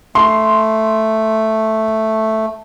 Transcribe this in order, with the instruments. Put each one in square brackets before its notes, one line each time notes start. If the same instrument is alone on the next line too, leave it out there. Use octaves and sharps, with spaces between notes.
[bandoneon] A3 [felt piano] C6